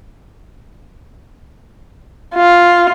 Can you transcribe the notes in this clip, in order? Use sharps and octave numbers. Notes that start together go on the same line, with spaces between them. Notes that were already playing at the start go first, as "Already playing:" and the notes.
F4